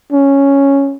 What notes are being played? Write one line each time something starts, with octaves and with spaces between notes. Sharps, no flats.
C#4